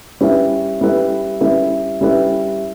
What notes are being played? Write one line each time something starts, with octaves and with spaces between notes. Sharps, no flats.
G3 C#4 E4 B4 E5
G3 C#4 E4 B4 E5
G3 C#4 E4 B4 E5
G3 C#4 E4 B4 E5